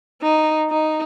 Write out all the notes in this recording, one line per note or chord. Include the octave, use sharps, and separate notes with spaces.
D#4
D#4